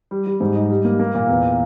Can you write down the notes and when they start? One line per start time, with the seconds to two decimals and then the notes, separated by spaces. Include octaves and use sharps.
0.11 G3
0.27 G3
0.40 G#2
0.56 D#4
0.70 G3
0.85 A#3
1.00 A#3
1.15 A#2
1.29 E2